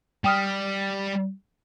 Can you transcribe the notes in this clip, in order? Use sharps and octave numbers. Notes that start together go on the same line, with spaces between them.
G3 G5 D#6 F6